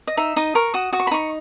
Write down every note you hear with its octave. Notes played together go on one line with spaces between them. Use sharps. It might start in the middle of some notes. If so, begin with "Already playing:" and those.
D#5
D#4 E5
D#4 D#6
A#4 C#6
F#4 D#6
F#4 D#6
C#6
B5
D#4 C#6